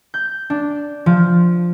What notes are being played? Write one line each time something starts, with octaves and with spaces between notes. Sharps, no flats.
G6
D4
F3